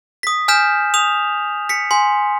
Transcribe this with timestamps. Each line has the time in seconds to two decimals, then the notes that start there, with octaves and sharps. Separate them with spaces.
0.23 D#6 B6
0.48 G#5 F6 G6 B6 E7
0.94 D#6 F7
1.69 B6 C#7
1.91 G#5 C6